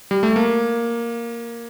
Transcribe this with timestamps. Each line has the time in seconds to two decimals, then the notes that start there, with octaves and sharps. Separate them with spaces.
0.11 G3
0.23 A3
0.36 A#3